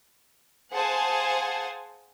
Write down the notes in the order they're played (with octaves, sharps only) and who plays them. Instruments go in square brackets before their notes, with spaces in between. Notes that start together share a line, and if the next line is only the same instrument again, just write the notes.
[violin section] G#4 C5 F5 F#5 G#5 A5